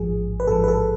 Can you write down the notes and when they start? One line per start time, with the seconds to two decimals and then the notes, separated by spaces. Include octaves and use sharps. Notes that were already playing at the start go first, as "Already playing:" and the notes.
Already playing: A1 G#2 F3 G#4
0.40 B4
0.47 A1 G#2 F3 A4
0.64 B4
0.68 A4